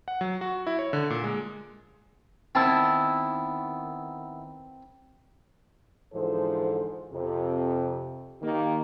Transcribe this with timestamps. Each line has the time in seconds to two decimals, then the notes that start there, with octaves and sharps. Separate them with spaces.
0.08 F#5
0.21 F#3
0.41 F#4
0.67 E4
0.79 C#5
0.93 D3
1.10 A#2
1.24 G#3
2.55 D#3 B3 C4 E4 A5
6.14 G#2 D3 E3 F3 A4 C5
7.12 F2 C3
8.42 D#3 A#3 G4